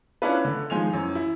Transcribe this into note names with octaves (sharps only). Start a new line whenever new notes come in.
C#4 D4 E4 F4 B4
D3
D#3 F3 G#3 G#5 C6 F7
F#2 E3
E4